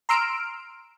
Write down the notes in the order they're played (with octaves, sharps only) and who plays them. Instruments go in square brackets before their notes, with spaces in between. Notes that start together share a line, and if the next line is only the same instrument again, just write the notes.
[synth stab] A#5 C6 E6 F6 D7